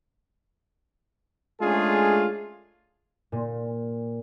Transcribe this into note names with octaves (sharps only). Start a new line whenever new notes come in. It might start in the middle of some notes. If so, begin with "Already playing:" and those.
G#3 A3 C#4 D4 F4 G#4
A#2